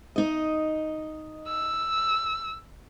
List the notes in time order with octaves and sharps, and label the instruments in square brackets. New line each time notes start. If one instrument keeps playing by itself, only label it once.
[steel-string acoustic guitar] D#4 D#5
[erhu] E6